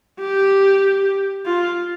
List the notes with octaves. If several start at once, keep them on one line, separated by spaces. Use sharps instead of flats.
G4
F4